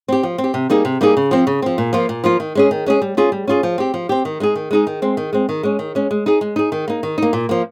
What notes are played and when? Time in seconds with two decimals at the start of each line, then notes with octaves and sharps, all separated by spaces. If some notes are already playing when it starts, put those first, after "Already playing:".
0.08 C4 G4
0.23 F3
0.38 C4
0.44 G4
0.54 C3
0.70 G3 A#3 D#4 G#4
0.85 C3
1.01 G3 A#3 D#4 G#4
1.17 C#3
1.31 F3 C4
1.47 C#3
1.62 F3 C4
1.78 A#2
1.93 F3 A#3 F4
2.09 A#2
2.24 F3 A#3 F4
2.40 D#3
2.55 G#3 C#4 G#4
2.71 D#3
2.86 G#3 C#4 G#4
3.02 G3
3.17 C#4 F4 G#4
3.32 G3
3.47 C#4 F4 G#4
3.63 F3
3.78 C4 G4
3.94 F3
4.09 C4 G4
4.25 D#3
4.40 G#3 D#4 G#4
4.55 D#3
4.71 G#3 D#4 G#4
4.87 D#3
5.02 G#3 C4
5.17 D#3
5.33 G#3 C4
5.49 D#3
5.63 G#3 C#4
5.79 D#3
5.95 G#3 C#4
6.11 G#3
6.26 D#4 G#4
6.41 G#3
6.56 D#4 G#4
6.72 D#3
6.88 A#3 D#4
7.03 D#3
7.18 A#3 D#4
7.33 A#2
7.49 F3 A#3